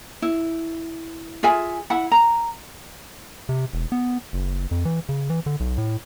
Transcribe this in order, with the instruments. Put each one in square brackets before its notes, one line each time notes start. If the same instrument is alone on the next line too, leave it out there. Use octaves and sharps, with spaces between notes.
[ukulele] E4
F4 G#4 E5 G#5
E4 F#5 B5
A#5
[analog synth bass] C3
E1
B3
F#1
F2
E3
C#3
E3
D3
B1
A2